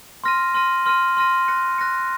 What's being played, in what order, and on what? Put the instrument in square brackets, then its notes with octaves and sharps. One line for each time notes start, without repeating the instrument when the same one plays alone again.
[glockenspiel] C6 F6 A#6 D#7
C6 F6 A#6 D#7
C6 F6 A#6 D#7
C6 F6 A#6 D#7
F#6 A#6 C#7
F#6 A#6 C#7